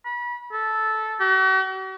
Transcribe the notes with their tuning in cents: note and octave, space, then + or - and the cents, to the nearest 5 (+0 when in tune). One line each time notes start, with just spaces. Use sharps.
B5 -30
A4 -10
F#4 +45